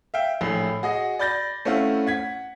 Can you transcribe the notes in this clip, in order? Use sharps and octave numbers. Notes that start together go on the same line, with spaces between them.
E5 F5 G5
A#1 A2
F#4 G#4 D#5
D5 B5 G6 A6 A#6
A3 C4 C#4 E4 F5 F#5
F#5 G#6 B6